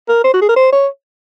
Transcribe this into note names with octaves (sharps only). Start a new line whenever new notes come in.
A#4
C5
F#4
G#4
A#4
C5
C#5